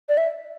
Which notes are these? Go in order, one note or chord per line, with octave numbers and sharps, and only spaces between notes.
D5
E5